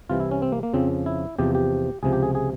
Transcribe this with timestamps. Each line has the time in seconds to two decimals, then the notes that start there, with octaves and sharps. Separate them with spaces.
0.10 C2 C3 E3 F4
0.20 E4
0.31 C#4
0.42 C4
0.52 A#3
0.63 A#3
0.74 F2 C#3 F3 C4
1.06 E4
1.38 E2 C3 F3 G4
1.55 G4
2.03 C#2 C3 F3 G#4
2.13 G4
2.23 G#4
2.35 G#4